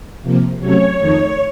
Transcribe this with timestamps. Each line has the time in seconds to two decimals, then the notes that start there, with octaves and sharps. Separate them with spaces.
0.22 C3 F3 A#3
0.60 C3 F#3 A3 C#4 C#5
0.98 F2 D#3 A3 D#4